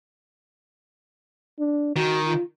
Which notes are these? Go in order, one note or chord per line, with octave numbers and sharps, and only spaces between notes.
D4
D#3 F#4
F4